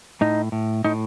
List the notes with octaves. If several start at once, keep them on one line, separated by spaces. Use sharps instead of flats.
A2 D#4
A2
A2 D#4